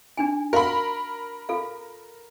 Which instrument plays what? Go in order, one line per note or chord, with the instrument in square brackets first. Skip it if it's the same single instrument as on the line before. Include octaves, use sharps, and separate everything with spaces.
[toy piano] D4 D#4 G#5
[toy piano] F#4 F5 C6 [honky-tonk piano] A#4 B5
[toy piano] F4 A4 F5